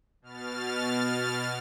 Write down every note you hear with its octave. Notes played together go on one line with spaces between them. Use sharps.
B2 F6 A6